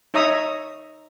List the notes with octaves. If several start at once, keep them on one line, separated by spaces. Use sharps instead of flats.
D#4 C#5 E5 A#5 D#6